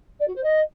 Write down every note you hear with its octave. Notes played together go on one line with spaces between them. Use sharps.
D5
F#4
C5
D#5